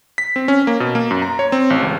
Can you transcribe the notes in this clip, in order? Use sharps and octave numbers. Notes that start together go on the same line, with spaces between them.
B6
C4
C#4
A#3
B2
A#3
F#2
A#5
C#5
C4
A1
C#2